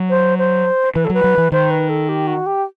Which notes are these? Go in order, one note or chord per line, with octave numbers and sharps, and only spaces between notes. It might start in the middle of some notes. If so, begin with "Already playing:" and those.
Already playing: F#3
C5
C5
E3 B4
A4
F#3 B4
F#3
E3
D#3 C5
B4
A4
G4
F#4
G4